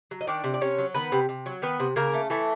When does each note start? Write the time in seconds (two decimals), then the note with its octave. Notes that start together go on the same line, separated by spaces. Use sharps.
0.11 F#3
0.21 D#5
0.27 D#3 D4 D5
0.44 C3
0.54 D5
0.61 C3 C#4 C#5
0.78 F#3
0.94 D#3 B3 B4
1.12 C3
1.29 C3
1.46 F#3
1.62 D#3 B3 B4
1.80 C3
1.96 C#3 A#3 A#4
2.14 A3
2.30 E3 A3 A4